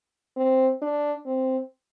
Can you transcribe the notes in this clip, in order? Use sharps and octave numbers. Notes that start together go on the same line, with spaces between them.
C4
D4
C4